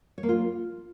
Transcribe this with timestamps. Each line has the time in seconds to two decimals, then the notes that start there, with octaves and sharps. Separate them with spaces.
0.18 C#5
0.23 A#3
0.29 F4